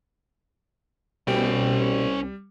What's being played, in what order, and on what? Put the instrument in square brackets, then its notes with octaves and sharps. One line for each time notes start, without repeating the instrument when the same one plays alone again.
[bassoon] C2 [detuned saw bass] B2 [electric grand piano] G3 [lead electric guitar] C#4 G5